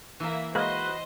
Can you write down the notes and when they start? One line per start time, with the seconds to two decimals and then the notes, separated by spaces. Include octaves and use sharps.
0.20 E3 A#3 E5
0.55 G#3 A#3 F#4 B4 C5 D#5